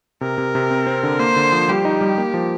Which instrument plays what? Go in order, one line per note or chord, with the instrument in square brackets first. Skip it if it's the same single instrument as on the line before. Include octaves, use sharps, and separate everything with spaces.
[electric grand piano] C3 [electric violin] A#4
[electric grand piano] C3
C3
C4
C4
D3
[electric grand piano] A#3 [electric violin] C5
[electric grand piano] D3
F3
[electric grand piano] G3 [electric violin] G4
[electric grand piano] D#4
G3
A#3
F3